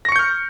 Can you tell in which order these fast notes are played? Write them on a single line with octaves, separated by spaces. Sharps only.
A#6 C#6 C#7 G6 F6